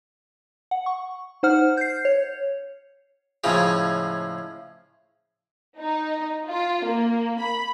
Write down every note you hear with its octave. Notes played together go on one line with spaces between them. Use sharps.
F#5
C#6
D#4 C5 F#5 F6
G6 C7
C#5
A2 C#3 F3 G#3
D#4
F4
A#3
B5